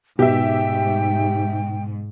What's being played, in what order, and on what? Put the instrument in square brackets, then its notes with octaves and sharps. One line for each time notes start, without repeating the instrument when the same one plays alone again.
[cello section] G#2 [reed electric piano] B2 [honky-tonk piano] G4 E5 [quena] G5